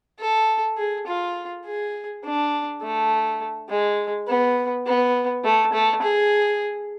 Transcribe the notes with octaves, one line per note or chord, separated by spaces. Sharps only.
A4
G#4
F4
G#4
D4
A3
G#3
B3
B3
A3
A3
G#4